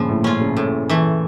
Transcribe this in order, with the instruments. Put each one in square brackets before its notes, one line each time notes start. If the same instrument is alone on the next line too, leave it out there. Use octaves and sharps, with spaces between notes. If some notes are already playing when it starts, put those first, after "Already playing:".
Already playing: [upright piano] G2 A#2 C#3 [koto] F3
[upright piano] A2
[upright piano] A#2 [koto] C#4 F4
[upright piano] C#3
[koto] A2
E3 A3